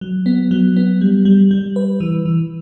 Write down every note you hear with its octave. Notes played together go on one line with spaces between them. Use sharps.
F#3
B3
F#3
B3
G3
G3
G3
B4
E3
E3